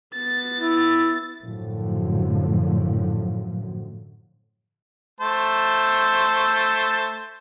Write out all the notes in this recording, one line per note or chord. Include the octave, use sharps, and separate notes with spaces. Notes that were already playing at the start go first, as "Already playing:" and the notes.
B3 A6
E4
F#2 A2 D3 F3 F#3
A3 C5 A5